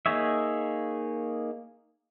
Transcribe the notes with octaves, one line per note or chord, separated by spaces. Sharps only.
A#3 D#4 G#4 C#5 E5